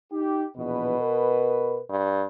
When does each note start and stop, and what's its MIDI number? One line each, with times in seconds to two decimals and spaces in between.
0.11 0.45 63
0.11 0.45 67
0.57 0.99 34
0.57 0.99 40
0.57 1.79 47
0.57 0.99 71
1.00 1.80 70
1.00 1.80 71
1.90 2.25 43